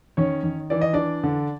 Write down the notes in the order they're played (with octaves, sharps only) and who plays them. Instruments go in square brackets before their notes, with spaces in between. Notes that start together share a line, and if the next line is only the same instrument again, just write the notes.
[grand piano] D#3 C#4 C#5
D#3
E3 D5
D#5
E3 D4 D5
D3